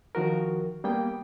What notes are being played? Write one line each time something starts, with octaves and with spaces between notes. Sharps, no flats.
D#3 F3 F#4 A#4
G3 A#3 B3 G5